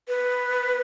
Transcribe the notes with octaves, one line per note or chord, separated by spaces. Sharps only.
B4